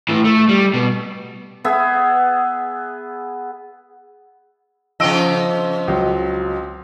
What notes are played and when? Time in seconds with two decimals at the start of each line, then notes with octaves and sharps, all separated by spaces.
0.09 A2 E3
0.25 A3
0.49 G3
0.74 B2
1.64 B3 G#4 E5
5.00 C#3 F3 C4 D#5 E6 D7
5.88 C#2 F#3